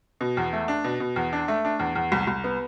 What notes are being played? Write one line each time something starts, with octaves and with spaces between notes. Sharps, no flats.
B2
E2
A3
D4
B2
B2
E2
D4
A3
D4
E2
E2
C2
C2
B3